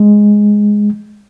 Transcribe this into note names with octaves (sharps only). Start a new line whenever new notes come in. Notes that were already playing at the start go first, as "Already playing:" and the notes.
Already playing: G#3